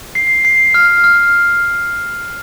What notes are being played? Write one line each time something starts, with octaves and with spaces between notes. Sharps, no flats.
C7
C7
F6
F6